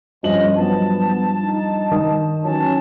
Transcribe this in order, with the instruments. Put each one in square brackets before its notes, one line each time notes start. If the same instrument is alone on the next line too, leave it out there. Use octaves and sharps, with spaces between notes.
[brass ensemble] G1 C#4 [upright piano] G2 F3 F#7 [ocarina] D#5
[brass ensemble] F#3 B3 [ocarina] A5
[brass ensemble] D#4
[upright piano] D#3 D#5 D#6
[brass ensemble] E3 F#3 C#4 [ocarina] A5